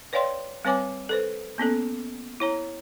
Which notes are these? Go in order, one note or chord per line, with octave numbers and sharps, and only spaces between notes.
B4 C#5 D5 F5 G5 C6
G3 C4 B4 C#5 G#5 D6
A4 B4 C5
A#3 B3 C#4 A4
E4 C#5 A#5